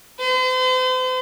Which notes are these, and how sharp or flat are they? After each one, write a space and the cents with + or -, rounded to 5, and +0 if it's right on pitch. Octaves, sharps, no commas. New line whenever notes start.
C5 -40